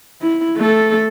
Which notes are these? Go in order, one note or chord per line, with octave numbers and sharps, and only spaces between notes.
E4
A3 A4